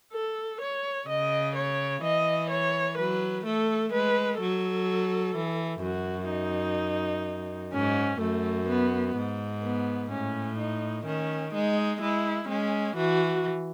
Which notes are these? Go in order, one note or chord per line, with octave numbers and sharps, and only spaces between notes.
A4
C#5
C#3 D#5
C#5
E3 D#5
C#5
F#3 B4
A3 A4
G#3 B4
F#3 A4
E3
F#2 F#4
D#4
G#2 C#4
F#2 A3
B3
G#2
B3
A2 C#4
D#4
D#3 C#4
G#3 D#4
G#3 E4
G#3 C#4
E3 F#4